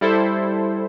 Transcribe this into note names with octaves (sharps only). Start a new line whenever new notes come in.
G3 E4 A4 C5